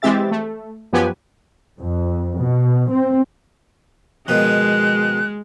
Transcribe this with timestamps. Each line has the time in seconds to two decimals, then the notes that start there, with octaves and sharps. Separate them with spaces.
0.02 E3 G#3 C4 G4 E5 A6
0.31 A3
0.93 F#2 F3 B3 G4 B4 G#5
1.79 F2
2.39 B2
2.92 C4
4.28 B2 D#3 F3 G#3 F#6